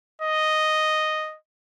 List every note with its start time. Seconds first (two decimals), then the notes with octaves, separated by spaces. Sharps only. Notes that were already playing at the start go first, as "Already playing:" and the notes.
0.22 D#5